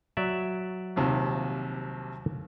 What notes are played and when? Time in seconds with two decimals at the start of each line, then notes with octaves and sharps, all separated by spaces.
0.17 F#3 D5 E5
0.96 A#1 D#2 C3